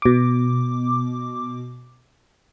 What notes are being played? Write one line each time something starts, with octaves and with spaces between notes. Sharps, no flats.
B2 D6